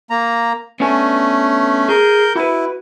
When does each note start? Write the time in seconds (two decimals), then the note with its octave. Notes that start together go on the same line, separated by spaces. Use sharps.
0.10 A#3 A#5
0.80 A3 B3 C#4 D4 G#5
1.89 G#4 A#4 G6
2.36 E4 F#4 B4